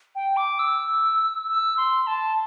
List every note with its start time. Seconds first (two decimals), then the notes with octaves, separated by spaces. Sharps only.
0.15 G5
0.37 D6
0.59 E6
1.48 E6
1.77 C6
2.07 A5